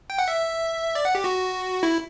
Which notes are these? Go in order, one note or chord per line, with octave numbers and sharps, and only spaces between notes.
G5
F#5
E5
D5
F#5
G4
F#4
E4